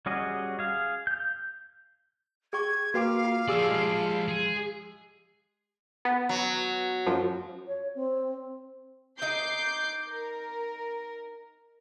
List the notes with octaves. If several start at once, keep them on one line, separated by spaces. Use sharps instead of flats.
G3 C#4 F#4 G#4 D#5
G#4 F5
G6
G#4 G5 C#6 G#6
A#3 F#4 B4 F5 G5 D6
F4
F3 G4 G#4 D5 E6
G#3 C7
G#4
B3
F#3
F#2 F3
C#5
C4
D#4 D#5 D6 G6 C7
A#4